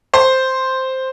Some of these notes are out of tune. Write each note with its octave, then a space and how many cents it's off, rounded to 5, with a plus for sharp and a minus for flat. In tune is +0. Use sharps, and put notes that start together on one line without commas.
C5 +0